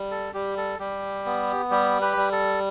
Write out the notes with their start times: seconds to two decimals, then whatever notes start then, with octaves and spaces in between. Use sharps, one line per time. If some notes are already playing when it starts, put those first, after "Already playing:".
Already playing: G3
0.11 A4
0.34 G3 G4
0.57 A4
0.79 G3 G4
1.26 B3
1.71 G3 G4
2.01 G4 B4
2.17 G3
2.32 A4